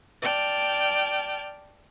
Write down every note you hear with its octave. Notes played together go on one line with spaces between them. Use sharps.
D5 G5 A5 F6